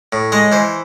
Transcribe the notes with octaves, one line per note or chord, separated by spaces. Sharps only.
A2
G#3 D#5
E3 C5